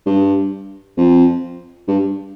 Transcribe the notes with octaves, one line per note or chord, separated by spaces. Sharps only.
G2
F2
G2